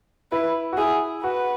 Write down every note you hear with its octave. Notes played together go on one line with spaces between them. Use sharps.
E4 B4
F#4
E4 G#4
F#4 B4